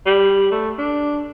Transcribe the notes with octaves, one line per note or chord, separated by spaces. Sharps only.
G3
A3
D4